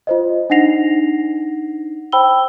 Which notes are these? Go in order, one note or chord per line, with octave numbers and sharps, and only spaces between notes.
F4 C5 D#5
D4 D#4 F#5 A#6 C7 F7
C5 G5 B5 E6 G7